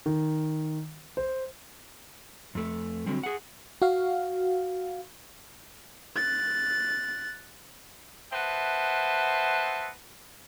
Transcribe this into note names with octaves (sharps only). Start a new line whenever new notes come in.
D#3
C5
F2 A3
D3 F#3 G3 C4
G#4 F#5
F#4 F5
F#6 A6
B4 C5 D#5 E5 F#5 A5